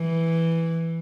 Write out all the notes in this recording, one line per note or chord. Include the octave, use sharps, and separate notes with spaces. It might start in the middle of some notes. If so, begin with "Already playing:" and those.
Already playing: E3